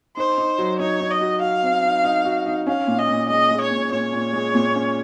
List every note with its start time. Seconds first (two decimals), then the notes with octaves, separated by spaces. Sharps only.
0.17 D#4 C5
0.38 D#4
0.58 F#3
0.79 D#4 C#5
1.01 D#4
1.10 D#5
1.21 F#4
1.42 F#4 F5
1.63 C4
1.83 D#4
2.04 D#4
2.25 F#4
2.46 D#4
2.67 C#4 F5
2.87 A#2
2.98 D#5
3.09 A#2
3.29 G#3 D#5
3.51 G#3
3.61 C#5
3.71 A#2
3.92 A#2 C#5
4.13 A#2
4.33 G#3
4.55 A#2
4.76 C#4